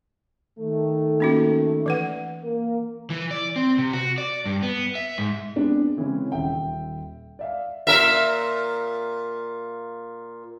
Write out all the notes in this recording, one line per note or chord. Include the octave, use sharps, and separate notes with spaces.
D#3 A3
A#3 C#4 F#4
E3 B4 F#5
A#3 A#4
E3
D5
C4
C3
F#4
D5
G2
B3
E5
G#2
G#3 B3 C4 D4
C#3 E3 G#3 C4 C#4
D#1 E5 G5
D5 E5 F5
A#2 A#4 E5